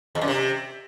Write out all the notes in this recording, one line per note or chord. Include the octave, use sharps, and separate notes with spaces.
E2
F#2
C3